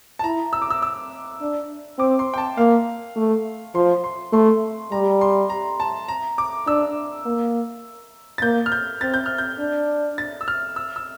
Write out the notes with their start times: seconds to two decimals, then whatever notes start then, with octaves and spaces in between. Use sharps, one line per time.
0.19 A5
0.24 E4 A#5
0.53 E6
0.62 D6
0.70 E6
0.82 E6
1.41 D4
1.99 C4 D6
2.19 C6
2.34 G5
2.38 A5
2.57 A#3 F5
3.16 A3
3.74 F3 C6
4.04 C6
4.33 A3 C6
4.92 G3 A#5
5.21 C6
5.50 A#5
5.80 A5
6.08 A#5
6.38 D6
6.67 D4 E6
7.26 A#3
8.38 A6
8.42 A#3 G6
8.66 F6
8.72 G6
9.01 C4 A6
9.14 G6
9.26 F6
9.38 G6
9.59 D4
10.18 A6
10.41 E6
10.48 F6
10.76 E6
10.96 E6